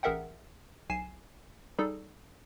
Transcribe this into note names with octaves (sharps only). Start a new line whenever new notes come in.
A1 G#4 A#4 E5 F#5 G5
B1 G#5 C7 E7
G3 D#4 G#4 A4